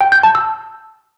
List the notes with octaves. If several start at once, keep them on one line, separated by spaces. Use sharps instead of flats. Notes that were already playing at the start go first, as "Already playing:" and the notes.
G5
G6
A5
E6